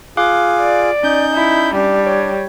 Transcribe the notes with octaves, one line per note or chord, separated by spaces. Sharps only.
F4 G#4 F5 D6 F#6
D5
C#4 D#4 G6
E4
G3 D4
C#5